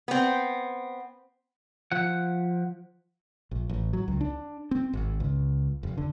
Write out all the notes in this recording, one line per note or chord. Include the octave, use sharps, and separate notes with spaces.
B3 C4
F3 F#5
A#1
A1
F#3
C#2
D4
C4
G#1
C#2
F1
D3